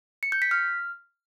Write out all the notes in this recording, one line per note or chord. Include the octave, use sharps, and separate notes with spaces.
C#7
G6
B6
F6